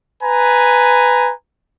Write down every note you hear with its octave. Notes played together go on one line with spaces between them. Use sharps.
B4 G#5 A#5